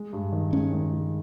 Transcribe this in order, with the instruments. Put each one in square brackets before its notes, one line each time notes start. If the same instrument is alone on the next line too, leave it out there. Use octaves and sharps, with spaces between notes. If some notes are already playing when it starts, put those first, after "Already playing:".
Already playing: [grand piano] G#3
G2
D#3
[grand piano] G#3 [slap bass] C#4
[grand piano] D#3
G#3